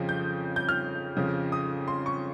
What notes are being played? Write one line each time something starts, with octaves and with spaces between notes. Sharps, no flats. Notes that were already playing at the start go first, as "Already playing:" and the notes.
Already playing: F2 C#3 F3
G6
G6
F6
F2 C#3 F3
D#6
C6
C#6